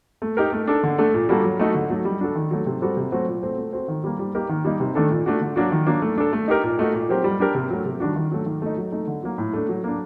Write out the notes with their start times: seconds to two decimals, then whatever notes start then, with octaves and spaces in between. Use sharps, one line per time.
0.22 A3
0.37 D#4 G4 A#4
0.52 A3
0.67 D4 A4
0.83 D3
0.98 A3 D4 A4
1.14 A#2
1.29 G3 A#3 F#4 A4
1.44 F#3
1.59 A3 D#4 F#4 A4
1.75 D3
1.90 F#3 A3
2.05 G3
2.21 D4 F#4 A4
2.36 D#3
2.51 F#3 A3
2.66 C3
2.82 G3 C4 F#4 A4
2.97 C3
3.12 F#3 A3 C4 F#4
3.27 A#2
3.43 A3 C4
3.58 A3
3.73 C4 F#4 A4
3.88 D#3
4.04 G3 A#3
4.19 G3
4.35 A#3 D#4 G4 A#4
4.49 D#3
4.64 G3 A#3 D#4
4.80 C3
4.95 D#3 A3 D4 A4
5.10 A#2
5.26 A3 D4 F#4
5.41 D3
5.56 F#3 A#3 D4 F#4
5.72 D#3
5.87 F#3 A#3 D4
6.02 A3
6.18 D4 A4
6.33 A3
6.48 D#4 G4 A#4
6.63 A#2
6.79 A3 D#4 F#4
6.94 A#2
7.09 F#3 C4 G4 A#4
7.24 G3
7.40 D4 G4 A#4
7.55 C3
7.70 F#3 A3
7.86 C3
8.00 D#3 G3 D4 F#4
8.16 D#3
8.31 F#3 A3
8.46 D#3
8.62 A3 D#4
8.77 F#3
8.92 A3 D#4
9.07 D3
9.23 F#3 A#3
9.38 A2
9.53 A3 D4 A4
9.69 F#3
9.84 A#3 D4